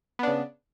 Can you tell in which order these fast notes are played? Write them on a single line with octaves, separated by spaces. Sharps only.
B3 D4 C#3